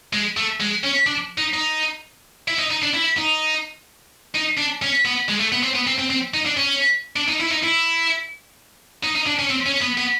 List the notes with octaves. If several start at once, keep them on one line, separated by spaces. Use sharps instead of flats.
G#3
A3
G#3
C#4
D4
D#4
D#4
E4
D#4
D#4
D4
E4
D#4
D#4
D4
C#4
B3
G#3
A3
B3
C4
B3
C4
C4
C4
D#4
D4
C#4
D4
D#4
E4
D#4
E4
D#4
D#4
D4
C#4
C4
C#4
B3
B3